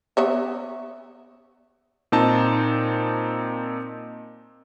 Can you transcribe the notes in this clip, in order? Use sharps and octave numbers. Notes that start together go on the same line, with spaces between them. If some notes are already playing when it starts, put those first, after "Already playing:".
B3 C#5 E5
A#2 C4 D#4 A5